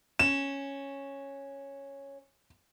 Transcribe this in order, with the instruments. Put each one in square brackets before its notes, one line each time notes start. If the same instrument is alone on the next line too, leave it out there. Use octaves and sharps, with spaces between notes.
[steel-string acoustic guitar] C#4 [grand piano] E7